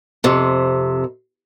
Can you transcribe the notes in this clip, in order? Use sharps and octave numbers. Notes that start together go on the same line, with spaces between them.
F2 C3